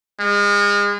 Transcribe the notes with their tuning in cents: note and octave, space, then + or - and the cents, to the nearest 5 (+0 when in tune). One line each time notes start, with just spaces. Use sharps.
G#3 -35